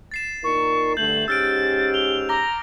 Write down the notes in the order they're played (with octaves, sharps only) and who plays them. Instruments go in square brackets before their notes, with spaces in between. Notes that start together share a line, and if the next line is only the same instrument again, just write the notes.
[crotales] A6 C7 E7
[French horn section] A#2 D#4 A#4 [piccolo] C#6
[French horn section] G2 D3 A3 [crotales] G6 [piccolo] F#7
[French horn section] G#2 C#4 G4 [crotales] E6 F6 D7 [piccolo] A6
[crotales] F7 [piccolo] G7
[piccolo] A#5 [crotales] D6 A#6 G7